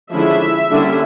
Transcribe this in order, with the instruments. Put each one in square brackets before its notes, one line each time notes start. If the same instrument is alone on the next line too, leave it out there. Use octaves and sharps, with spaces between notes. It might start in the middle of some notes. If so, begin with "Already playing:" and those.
[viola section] D3 F3 G#3 C#4 E4 E5
D3 G3 A#3 C#4 E4